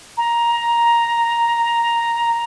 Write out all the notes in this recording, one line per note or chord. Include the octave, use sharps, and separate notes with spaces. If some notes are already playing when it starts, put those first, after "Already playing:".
A#5